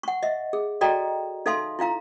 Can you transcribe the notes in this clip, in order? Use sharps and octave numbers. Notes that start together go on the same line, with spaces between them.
F#5 C#6
D#5 E5
G#4
F#4 A4 D5 D#5 G5 A#5
D#4 A4 E5 F5 A5 C6
E4 F4 F5 A#5